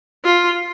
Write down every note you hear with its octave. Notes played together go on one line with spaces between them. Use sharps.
F4